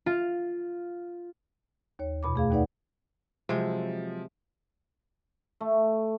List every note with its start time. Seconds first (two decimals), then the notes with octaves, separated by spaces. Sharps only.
0.06 F4
1.99 D#2 C#5
2.23 F2 B2 B5 D6
2.36 A3 G#4 F5
2.51 D#2 D#4 B4 D5 F#5
3.49 C3 F3 F#3 G#3
5.61 A3